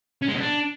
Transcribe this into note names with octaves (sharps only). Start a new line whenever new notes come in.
C#4
G#3
B2
D4